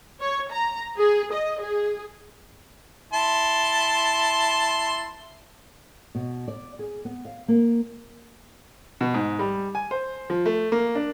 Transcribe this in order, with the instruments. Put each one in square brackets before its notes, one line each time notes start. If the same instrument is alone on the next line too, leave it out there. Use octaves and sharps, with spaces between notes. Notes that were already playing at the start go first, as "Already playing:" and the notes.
[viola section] C#5
A#5
G#4
D#5
G#4
[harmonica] E4 A5 C6
[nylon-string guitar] B2
D5
G#4
B3
F5
A#3
[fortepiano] B2
G#2
G3
G#5
C5
F3
A3
A#3
D4